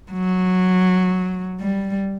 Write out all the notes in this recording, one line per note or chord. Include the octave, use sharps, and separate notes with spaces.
F#3
G3